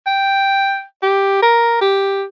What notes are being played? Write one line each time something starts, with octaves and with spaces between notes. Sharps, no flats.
G5
G4
A#4
G4